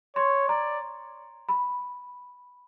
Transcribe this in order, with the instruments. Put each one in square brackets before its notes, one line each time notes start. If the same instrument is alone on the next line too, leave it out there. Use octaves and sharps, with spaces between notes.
[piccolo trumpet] C#5 [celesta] C6
[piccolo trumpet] D5 [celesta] A#5
[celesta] B5